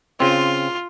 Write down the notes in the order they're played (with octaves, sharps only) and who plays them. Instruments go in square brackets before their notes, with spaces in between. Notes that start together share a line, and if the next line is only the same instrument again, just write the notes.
[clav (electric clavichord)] C#3 C4 [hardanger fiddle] F4